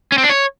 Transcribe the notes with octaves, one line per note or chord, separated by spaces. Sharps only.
C#4
C4
D4
C#5